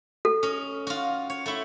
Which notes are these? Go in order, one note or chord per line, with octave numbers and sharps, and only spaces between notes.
A4
C#4 D#5
F4 F#4
C#5
A3 E4